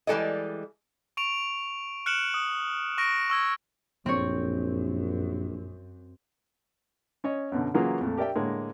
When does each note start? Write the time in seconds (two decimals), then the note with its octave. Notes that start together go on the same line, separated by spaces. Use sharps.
0.07 E3 G3 G#3 A4 D5 D#5
1.17 C#6 D7 F7
2.06 F6 F#6 C#7 D7 E7 F#7
2.34 D#6
2.98 C#6 F6 A#6 D7
3.30 C#6 E6 G#6
4.06 A#1 F#2 C4 C#5
7.24 C#4 C#5 D#5
7.52 F#2 B2 D3
7.74 C#3 E3 F#3 A#3 F4 G#4
8.01 F2 A#2 A3
8.17 G4 A#4 D5 E5 G5
8.36 A2 D3 G#3 A#3